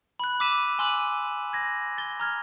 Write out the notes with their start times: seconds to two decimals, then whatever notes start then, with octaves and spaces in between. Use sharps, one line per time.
0.20 B5 F#6
0.40 D6 E6 B6 D#7 E7
0.79 G#5 C6 D6 E6 F#6 F#7
1.53 G#6 A#6
1.98 A6 G7
2.20 A#5 F6 G#6